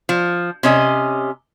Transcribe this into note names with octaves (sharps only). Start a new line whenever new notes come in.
F3
C3 C#4 D#5